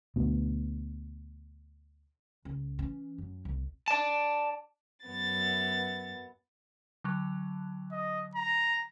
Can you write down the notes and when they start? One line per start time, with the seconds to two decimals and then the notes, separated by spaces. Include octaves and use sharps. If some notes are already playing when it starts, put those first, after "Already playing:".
0.16 D2 B2
2.45 C#2
2.79 E3 C#4
3.18 F#2
3.45 C2
3.88 D5 A5
5.05 F#2 B3 A6
7.04 D3 F#3
7.92 D#5
8.35 A#5